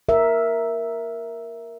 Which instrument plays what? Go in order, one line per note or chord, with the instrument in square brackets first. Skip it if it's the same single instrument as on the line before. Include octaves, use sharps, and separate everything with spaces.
[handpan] A#4 E5